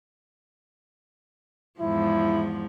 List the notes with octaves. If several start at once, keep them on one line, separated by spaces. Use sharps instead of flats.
E2 G#2 F3 E4